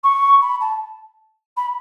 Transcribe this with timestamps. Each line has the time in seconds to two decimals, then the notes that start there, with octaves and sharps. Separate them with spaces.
0.03 C#6
0.41 B5
0.60 A5
1.57 B5